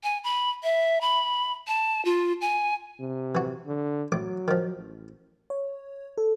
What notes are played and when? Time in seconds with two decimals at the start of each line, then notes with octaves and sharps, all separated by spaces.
0.03 G#5
0.24 B5
0.63 E5
1.01 B5
1.67 A5
2.05 F4
2.41 G#5
3.00 C3
3.35 E3 F#4
3.67 D3
4.12 A1 F#3 D6
4.48 D#3 F3
4.77 A1
5.50 C#5
6.18 A4